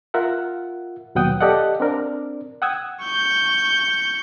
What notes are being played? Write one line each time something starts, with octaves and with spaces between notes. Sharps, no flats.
F4 A#4 E5 F#5
D#2 B2 F#3 F#5 G5 D#6
G4 A4 D5 D#5 F5 F#5
C4 D4 A#4 D5
F#5 G5 D#6 E6 G#6
C#6 G6